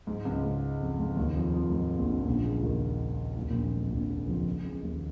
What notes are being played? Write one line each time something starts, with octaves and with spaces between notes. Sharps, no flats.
G#2
C#2 C#3
G#2
F2
G#2
D#2 D#3
F2 F3
F2 F3
G#2
A#1 A#2
C#2 C#3
A#1 A#2
C#2 C#3
D#2 D#3
D#2 D#3
A#1 A#2
F2
G#2
A#1 A#2
C#2 C#3
F2 F3
C#2 C#3
D#2 D#3